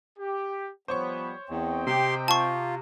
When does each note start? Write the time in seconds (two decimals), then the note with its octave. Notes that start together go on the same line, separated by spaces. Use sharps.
0.19 G4
0.88 F3 G3 B3 C5 C#5 C#6
1.50 E2 C4 D#5 G5
1.87 C3 G4 C6
2.28 F4 A5 C#6